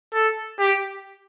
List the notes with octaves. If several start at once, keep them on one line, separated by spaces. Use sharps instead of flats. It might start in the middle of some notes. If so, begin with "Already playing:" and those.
A4
G4